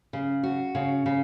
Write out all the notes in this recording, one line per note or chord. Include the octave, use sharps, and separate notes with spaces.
C#3
F#4
C#3
C#3